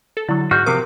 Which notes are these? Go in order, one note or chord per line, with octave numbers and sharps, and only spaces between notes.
A4
D3 F#3 E4
G#2 F#4 F6 G6
C3 F3 A#4 D6